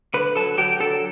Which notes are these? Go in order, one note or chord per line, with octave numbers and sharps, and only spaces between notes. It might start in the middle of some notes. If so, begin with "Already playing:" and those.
D3 B4 B5
F#3 A4 A5
F#3 G4 G5
D3 A4 A5